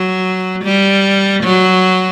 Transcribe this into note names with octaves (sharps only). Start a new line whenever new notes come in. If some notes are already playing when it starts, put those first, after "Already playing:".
Already playing: F#3
G3
F#3